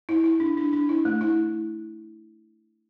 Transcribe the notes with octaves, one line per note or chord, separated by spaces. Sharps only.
E4
E4
D4
D4
D4
E4
A3
E4